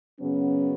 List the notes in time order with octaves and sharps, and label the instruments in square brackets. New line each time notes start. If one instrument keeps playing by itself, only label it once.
[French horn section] F#2 C#3 F#3 B3 C#4